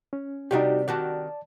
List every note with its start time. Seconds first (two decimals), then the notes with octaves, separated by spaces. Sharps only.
0.13 C#4
0.51 C3 G3 D4 D#4 F#4 G4
0.88 D#3 F#4 G4 D5 A5